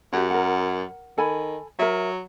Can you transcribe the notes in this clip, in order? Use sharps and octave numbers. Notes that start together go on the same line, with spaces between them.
F#2 F#4 G4
A#4 F#5
D#3 A4 G#5 B5
F#3 A#4 E5